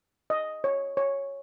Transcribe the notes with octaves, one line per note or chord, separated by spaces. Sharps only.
D#5
C#5
C#5